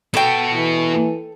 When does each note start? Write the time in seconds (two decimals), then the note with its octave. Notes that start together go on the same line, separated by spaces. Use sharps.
0.14 B3 F#4 A4 G5
0.53 E3